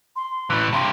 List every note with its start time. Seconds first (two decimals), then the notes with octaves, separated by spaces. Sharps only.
0.16 C6
0.50 A2 E3
0.73 G2 C3 C6